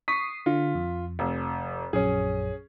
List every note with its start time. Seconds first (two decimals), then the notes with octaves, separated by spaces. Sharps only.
0.08 C#6 D#6 B6 C7
0.46 D3 F4
0.75 F2
1.19 F1
1.93 A#1 F#2 C#4 G#4